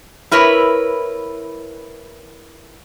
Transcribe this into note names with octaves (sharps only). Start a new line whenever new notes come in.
E4 A#4 B4 C#5